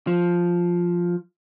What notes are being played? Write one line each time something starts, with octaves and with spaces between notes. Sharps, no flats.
F3